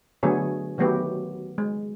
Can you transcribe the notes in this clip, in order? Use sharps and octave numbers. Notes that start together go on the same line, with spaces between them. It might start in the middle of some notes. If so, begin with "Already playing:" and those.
D3 F#3 A3 B3 G#4 C#5
D#3 F#3 A3 B3 F#4 G4
G#3